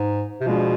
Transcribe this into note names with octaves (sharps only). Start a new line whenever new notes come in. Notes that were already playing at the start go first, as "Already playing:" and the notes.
Already playing: G#2
C3
B2 F3 G#3 D4